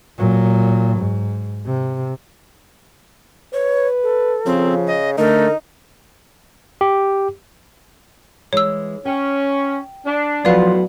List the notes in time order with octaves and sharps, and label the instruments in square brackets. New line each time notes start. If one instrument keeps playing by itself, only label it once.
[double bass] A#2 F#3
G#2
C3
[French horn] B4 [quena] C#5
[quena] A4
[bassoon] C#3 [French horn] F3 [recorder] C4
[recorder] D#5
[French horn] D3 [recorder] A3 [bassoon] D#4 [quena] A#4
[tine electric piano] G4
[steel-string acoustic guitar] E3 G#3 [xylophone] C#5 E6
[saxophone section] C#4 [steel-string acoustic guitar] G5
[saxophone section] D4
[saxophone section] A2 B3 [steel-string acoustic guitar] F3 F4 B4 [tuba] F#3 [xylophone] D5 F5